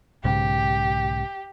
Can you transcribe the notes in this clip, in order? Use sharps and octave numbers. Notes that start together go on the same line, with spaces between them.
B1 G#2 C#3 G4